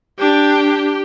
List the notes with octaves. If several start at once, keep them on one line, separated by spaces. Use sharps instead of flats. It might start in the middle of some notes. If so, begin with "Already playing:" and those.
D4 G4 G5